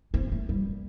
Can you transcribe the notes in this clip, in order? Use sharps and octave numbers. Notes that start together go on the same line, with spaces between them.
C4
A3
G3